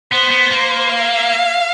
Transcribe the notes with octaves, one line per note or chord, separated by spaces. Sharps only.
B3 C5
B3
A#3
F5